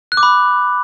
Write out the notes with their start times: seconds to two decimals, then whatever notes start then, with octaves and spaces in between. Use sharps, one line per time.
0.12 F#6
0.17 D6
0.23 B5